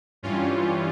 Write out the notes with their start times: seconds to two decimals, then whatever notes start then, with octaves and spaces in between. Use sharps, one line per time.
0.23 G2 E3 G3 C#4 F4